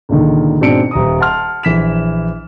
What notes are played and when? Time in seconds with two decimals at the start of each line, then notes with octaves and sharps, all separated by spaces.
0.09 C#2 A#2 D3 D#3
0.61 G#2 B2 C4 D4 C#7 D7
0.91 D#1 A#5 D#6
1.20 F#5 A5 C6 F6
1.63 A#1 E3 B6 E7